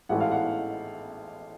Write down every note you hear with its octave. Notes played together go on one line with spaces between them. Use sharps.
A1 G#2 E3 A3 F#5
F5
F#5